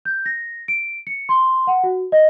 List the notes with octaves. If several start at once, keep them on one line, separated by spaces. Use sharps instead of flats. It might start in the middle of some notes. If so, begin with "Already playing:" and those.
G6
A#6
D7
C#7
C6
F#5
F#4
D#5